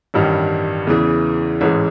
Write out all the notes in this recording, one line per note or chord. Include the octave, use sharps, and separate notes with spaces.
A1 G2 D#3 G3
E2 C#3 E3
A1 G#2 E3 G#3